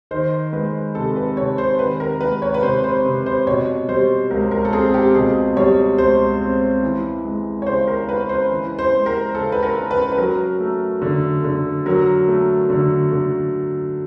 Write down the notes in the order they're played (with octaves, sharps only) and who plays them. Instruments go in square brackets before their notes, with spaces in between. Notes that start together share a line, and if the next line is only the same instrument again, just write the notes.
[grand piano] D#3 [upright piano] C5
[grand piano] G#3 [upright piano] B4
[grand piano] C3 [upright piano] A4
[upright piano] B4
[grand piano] C3 [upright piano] C#5
[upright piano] C5
[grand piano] D#3 [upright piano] B4
[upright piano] A#4
[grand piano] G#3 [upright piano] B4
[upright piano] C#5
B4
[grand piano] C3 [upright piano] C5
[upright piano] C5
[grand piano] C3
[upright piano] C5
[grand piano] B2 [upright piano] C#5
[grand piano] G3 [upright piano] C5
[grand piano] C#2 [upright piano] A#4
[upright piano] A#4
A4
[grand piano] C4 [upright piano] G#4
[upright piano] G4
[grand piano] B2 [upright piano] G#4
[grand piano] G3 [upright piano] C#5
[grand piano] C#2 [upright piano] C5
[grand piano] C4
E3
G#3
[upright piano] C#5
[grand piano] C#3 [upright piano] C5
[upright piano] A#4
[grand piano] C#4 [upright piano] B4
[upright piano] C5
[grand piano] E3
[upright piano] C5
[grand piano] G#3
[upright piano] A#4
[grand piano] C#3 [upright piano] A4
[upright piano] B4
A#4
[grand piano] C#4
[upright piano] B4
B4
[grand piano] F#3 [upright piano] A#4
[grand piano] A3
D3
D3
[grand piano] F#3 [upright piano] A#4
[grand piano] A3
D3
D3